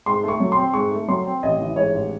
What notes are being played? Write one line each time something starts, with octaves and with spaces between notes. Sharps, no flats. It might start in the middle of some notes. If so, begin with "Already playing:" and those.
G#2 C6
A3 C#6
F#3
C4 C6
G#2 C#6
A3
F#3 C6
C4
A1 D#5
E3
G#2 C#5
A1